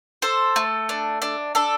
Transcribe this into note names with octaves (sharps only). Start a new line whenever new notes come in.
A4 C5
A3
D4
D4
D4 A4